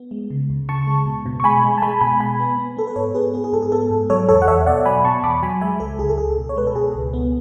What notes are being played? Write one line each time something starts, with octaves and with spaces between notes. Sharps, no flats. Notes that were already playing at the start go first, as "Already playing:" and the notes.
Already playing: B3
G#3
C#3
D2
C#3 A5 C#6
G#3
B2
B2
C#6
G#3 G#5 B5
G#3
A5
G#3 G#5 B5
B2 G#5 B5
G#3 G#5 B5
B3
B3
B3 A4
B4
G#2 A4 C#5
B3 G#4 B4
B3 G#4
G#4
G#2 A4
G#4
B3 A4
G#2
F#3 A4 C#5
E2 A4 C#5
F#5
E2 C#5 E5
B2 D5 F#5
F#3 G#5 B5
B2 A5 C#6
E2 B5 D6
F#3 G#5 B5
G#3 E5 G#5
C#2 A4
C#2 G#4
A4
C#2 G#4
B2
C#5
G#3 B4
A4
B2 G#4
C#2
B3